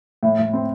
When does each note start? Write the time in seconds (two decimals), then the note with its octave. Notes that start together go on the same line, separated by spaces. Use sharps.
0.23 A2
0.39 A2
0.53 C4